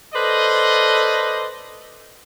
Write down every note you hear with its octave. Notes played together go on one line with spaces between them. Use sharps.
A4 B4 C5 D5 D#5